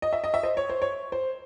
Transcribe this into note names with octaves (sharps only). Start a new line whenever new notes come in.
D#5
E5
D#5
E5
C5 D#5
C#5
C5
C#5
C5